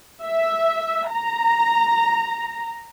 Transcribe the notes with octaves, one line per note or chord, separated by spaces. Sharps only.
E5
A#5